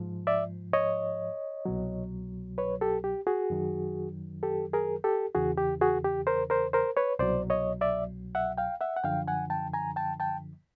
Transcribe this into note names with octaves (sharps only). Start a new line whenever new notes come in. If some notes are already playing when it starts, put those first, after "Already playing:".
Already playing: G#2 F3
D5 E5
C#5 D#5
C2 B2 F#3
B4 C#5
G4 A4
G4
F#4 G#4
F#2 D#3 F#3
G4 A4
G#4 A#4
G4 A4
E2 C#3 E3 F#4 G#4
G4
F#4 G#4
G4
A#4 C5
A#4 C5
A#4 C5
B4 C#5
C2 B2 F#3 C5 D5
C#5 D#5
D5 E5
E5 F#5
F5 G5
E5 F#5
F#5
F#2 D3 F3 F5 G5
F#5 G#5
G5 A5
G#5 A#5
G5 A5
G5 A5